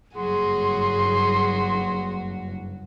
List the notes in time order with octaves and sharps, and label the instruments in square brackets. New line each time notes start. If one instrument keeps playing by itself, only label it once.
[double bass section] F#1 G2 [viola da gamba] F#3 F#4 [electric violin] G#4 [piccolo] C6